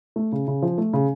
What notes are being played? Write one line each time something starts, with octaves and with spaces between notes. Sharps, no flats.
A3
C#3
C#3
F3
A3
C#3